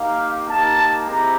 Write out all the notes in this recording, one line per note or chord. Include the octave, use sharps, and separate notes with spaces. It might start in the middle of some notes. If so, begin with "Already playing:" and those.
Already playing: A#3 D#4 G4 F5
A#3 D#4 G4 A5
G#3 C4 E4 G4 A#5